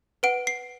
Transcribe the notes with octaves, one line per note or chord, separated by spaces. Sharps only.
B4 F#5 D7
C7